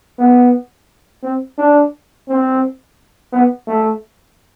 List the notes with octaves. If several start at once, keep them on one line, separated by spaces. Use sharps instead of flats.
B3
C4
D4
C4
B3
A3